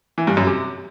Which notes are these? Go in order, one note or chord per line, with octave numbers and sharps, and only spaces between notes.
E3
G2
F#2
C3